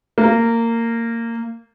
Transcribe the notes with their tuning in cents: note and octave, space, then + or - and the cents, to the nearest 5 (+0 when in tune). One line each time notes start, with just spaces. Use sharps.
A#3 -20